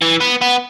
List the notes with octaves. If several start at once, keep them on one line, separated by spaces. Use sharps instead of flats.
E3
B3
B3